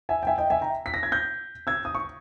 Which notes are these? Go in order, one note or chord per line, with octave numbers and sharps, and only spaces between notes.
E5 G#5
G5
E5 G#5
D#5 G5
E5 G#5
G5 A#5
B6
A#6
G#6
G6 A#6
E6 G#6
D#6
C#6